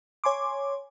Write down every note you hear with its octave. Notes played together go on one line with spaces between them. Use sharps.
C#5 G#5 C6 D6